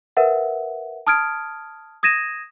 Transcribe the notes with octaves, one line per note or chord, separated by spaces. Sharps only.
A#4 B4 E5 F#5
A5 D#6 F6 G#6 D7
D#6 G#6 A#6 D#7 E7